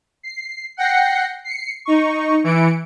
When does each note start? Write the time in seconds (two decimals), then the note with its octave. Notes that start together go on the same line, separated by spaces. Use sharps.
0.23 C7
0.77 F#5 G5 A#6 C7 C#7
1.44 C7 C#7
1.85 D#4 C#6
2.44 E3 C#7 D7